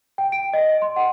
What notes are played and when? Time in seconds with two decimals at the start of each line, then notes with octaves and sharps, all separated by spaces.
0.18 G5
0.32 D7
0.54 D#5
0.82 C6
0.96 F#5